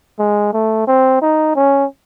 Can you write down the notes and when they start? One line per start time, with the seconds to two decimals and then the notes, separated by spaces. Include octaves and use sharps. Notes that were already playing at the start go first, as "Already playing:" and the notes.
0.19 G#3
0.53 A3
0.87 C4
1.22 D#4
1.55 C#4